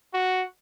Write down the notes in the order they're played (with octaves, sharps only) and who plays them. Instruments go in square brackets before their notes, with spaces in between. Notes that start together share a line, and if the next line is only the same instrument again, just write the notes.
[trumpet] F#4